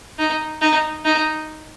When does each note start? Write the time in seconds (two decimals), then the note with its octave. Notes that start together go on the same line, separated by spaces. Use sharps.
0.19 D#4
0.62 D#4
1.05 D#4